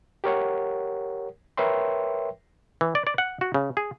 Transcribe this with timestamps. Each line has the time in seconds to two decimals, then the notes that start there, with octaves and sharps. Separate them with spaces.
0.24 G4 A#4 C#5 F#5
1.57 A#4 B4 C#5 E5 G5 C6
2.81 E3
2.95 D5
3.07 D5
3.18 F#5
3.41 F#4
3.54 C#3
3.77 G#4